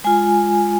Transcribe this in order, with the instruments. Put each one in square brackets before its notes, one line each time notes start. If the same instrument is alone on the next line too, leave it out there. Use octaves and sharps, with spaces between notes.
[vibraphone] G#3 F4 G#5